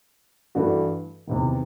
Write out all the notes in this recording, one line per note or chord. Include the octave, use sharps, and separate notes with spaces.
G2 E3 A3 D4 F#4
E2 C3 D#3